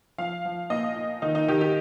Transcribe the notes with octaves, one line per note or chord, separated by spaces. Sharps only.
F3 F5
F3
A#2 D#5
A#2
D#3 D#4
D#4
D#3 G4
G4